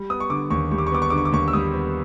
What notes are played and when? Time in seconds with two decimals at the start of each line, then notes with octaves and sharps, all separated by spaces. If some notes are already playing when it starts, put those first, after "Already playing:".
Already playing: G3
0.10 B3 D#6
0.20 C#6
0.30 D3 D6
0.50 D#2 C#6
0.71 G3 C#6
0.78 D6
0.87 C#6
0.92 B3 D6
1.02 C#6
1.10 D3 D6
1.18 C#6
1.25 D6
1.32 D#2 C#6
1.48 E6
1.53 G3 D#6
1.74 B3